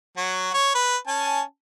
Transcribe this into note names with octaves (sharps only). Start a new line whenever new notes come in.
F#3 F#4
C#5
B4
C#4 G#5 A5